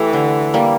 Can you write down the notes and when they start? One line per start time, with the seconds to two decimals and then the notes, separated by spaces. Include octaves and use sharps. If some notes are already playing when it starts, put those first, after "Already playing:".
Already playing: E3 A3 G4
0.13 D3
0.54 G3 A#3